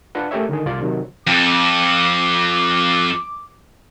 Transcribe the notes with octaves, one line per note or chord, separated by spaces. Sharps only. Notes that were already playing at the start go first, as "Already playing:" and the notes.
D4 F4 B4 F#5
A3 C#4 G4 A#4 C#5 E5
D3 D#3 G#4
C2 F4 D5 C6
C3 D#3 F#3
F2 D6